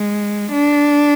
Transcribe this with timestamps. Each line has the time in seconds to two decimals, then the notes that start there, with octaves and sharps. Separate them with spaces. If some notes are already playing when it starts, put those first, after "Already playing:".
Already playing: G#3
0.52 D4